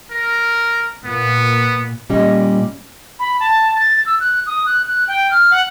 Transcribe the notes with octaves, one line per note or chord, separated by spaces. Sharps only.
A#4
A#2 B3
A#2 G3 C#4 D#5
B5
A5
A6
E6
F#6
D#6
F#6
F#6
G5
F6
F#5